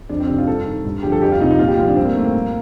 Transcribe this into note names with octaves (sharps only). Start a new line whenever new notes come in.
F2 D4
C4
C3 D#3
F4
G2 A4
D#3
G2
D3 F3 G4
A4
F2 G4
F4
C3 F3 D#4
D#4
A#2 F4
G4
F3 F4
D4
G2 C4
A#3
D#3 A3
A#3
A#2